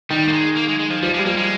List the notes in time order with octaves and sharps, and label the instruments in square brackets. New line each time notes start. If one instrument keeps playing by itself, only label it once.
[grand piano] D#3 [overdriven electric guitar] G3
[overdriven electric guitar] A#3
G#3
A#3
G#3
G#3
F3
[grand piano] F3 [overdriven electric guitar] G3
[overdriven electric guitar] G#3
[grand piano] G3
[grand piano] F3 [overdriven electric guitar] A#3
[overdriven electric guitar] G#3